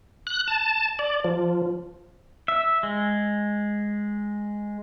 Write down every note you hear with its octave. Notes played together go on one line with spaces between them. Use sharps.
F#6
A5
D5
F3
E5
G#3